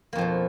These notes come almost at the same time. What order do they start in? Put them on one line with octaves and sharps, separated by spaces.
A#3 F2 F3 B2